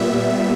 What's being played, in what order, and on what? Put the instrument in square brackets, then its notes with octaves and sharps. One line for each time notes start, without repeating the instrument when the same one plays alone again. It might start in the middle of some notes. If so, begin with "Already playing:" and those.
Already playing: [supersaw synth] A#2 G3 B3 E5